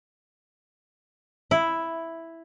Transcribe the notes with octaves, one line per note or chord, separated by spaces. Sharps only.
E4